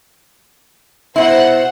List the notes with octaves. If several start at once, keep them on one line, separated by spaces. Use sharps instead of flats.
B2 E4 C5 F#5